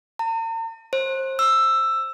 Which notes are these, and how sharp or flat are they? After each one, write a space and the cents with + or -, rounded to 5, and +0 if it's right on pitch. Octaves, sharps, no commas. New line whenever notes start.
A#5 -45
C5 +25
E6 +10